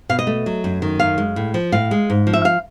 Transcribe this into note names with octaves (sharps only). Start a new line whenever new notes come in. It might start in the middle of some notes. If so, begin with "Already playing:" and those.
B2 F5
D#5
A3
F#3
F#2
D#3
F#2 F5
G#3
A2
F3
A2 F5
G#3
G#2
F3
E5
F5